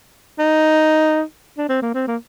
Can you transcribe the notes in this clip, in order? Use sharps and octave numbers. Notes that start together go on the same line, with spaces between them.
D#4
D4
C4
A#3
C4
A#3